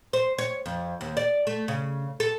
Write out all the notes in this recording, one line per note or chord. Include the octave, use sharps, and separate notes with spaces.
C5
C#5
F2
D#2
D5
A3
C#3
A4